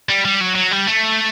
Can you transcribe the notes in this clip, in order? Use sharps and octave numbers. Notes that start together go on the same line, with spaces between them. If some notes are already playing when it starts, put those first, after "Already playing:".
G3
G3
F#3
F#3
G3
A3